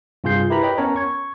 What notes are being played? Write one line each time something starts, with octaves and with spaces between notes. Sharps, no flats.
G2 C3 F4 G#4 G6 C7
E4 G4 A#4 B4 A#5 B5
B4 C#5 D#5 G5 B5
B3 C#4 A#4 C#5 A5 A#5
C#6 G#6